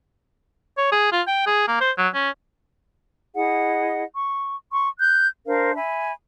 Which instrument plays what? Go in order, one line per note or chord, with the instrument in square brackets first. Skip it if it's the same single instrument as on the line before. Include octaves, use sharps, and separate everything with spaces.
[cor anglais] C#5
G#4
F4
G5
G#4
A#3
C5
F#3
C#4
[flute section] E4 G#4 D#5 F#5
C#6
C6 C#6
F#6 G6
D4 A#4 C5 F5
E5 G#5 B5